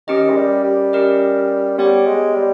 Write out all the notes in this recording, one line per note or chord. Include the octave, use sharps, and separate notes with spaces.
D#3 C#4 G4 A#4 D#5
G#3
G3
G3
C#4 G4 A#4 D#5
G3 B3 G4 C#5 G5
G#3
G3